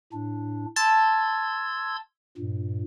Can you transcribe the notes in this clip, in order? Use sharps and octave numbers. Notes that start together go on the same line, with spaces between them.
A2 D4
A5 C6 E6 G#6
G2 A#2